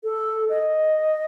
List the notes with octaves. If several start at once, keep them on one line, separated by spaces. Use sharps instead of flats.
A4
D#5